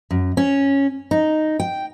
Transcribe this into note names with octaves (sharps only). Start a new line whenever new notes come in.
F#2
C#4
D#4
G5